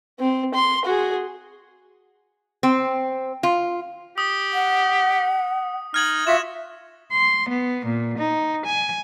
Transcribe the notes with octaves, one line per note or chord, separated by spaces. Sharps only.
C4
C6
F#4 G#4
C4
F4
G4 D#6
F#5
D#4 F6 G#6 F#7
F4 F#4 E5 C6 E7
C6
B3
A#2
D#4
G#5